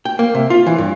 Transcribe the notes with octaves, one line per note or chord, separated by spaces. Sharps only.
G5
A#3
C3
F4
E3
G2